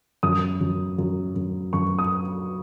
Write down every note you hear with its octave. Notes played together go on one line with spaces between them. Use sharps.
F#2 D#6
F#2
F#2
F#2
F#2 C#6
D#6